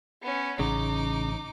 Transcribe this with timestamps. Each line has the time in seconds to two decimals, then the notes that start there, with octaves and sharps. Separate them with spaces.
0.23 B3 C#4
0.59 A1 C#3 D#4 D6